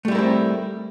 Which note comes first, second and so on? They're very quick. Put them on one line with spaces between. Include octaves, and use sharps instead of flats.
A3 G3 E4 A#4 C4